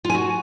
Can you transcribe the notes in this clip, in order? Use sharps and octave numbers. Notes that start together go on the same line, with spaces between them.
F4
G#5
F#4